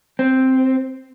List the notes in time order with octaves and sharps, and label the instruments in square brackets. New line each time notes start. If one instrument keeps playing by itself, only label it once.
[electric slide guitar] C4